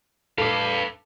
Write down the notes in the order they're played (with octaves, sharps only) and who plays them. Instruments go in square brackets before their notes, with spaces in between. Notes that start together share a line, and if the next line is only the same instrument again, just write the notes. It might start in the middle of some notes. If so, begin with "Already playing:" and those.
[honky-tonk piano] A4 D6 [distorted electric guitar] B4 F5